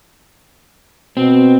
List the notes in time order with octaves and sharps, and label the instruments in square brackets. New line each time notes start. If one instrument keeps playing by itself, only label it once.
[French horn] B2 [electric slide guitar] C4